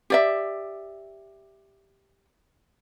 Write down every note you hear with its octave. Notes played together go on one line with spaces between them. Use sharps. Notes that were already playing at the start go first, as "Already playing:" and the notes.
G4 D5 E5